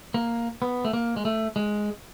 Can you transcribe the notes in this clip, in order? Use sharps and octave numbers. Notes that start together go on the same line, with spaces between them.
A#3
B3
A3
A#3
G#3
A3
G#3